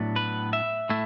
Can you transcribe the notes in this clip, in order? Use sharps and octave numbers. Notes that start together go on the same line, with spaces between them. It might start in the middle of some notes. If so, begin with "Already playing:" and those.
Already playing: A2 F#3 B3 D4
B4
E5
A2 A3 E4